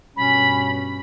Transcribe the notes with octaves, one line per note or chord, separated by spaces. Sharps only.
G2 B2 C#4 B5